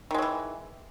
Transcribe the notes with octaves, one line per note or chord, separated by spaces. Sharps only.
D#3 E3 F#3 G#3